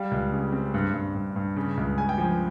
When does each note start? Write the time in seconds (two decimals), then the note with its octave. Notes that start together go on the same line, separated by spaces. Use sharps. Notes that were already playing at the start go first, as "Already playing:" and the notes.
Already playing: G3 F5
0.11 C#2
0.32 C#3
0.52 C4
0.74 G2
0.94 G2
1.15 G2
1.36 G2
1.56 C#3
1.77 C#2
1.98 C#3 G#5
2.09 G5
2.18 F3 G#5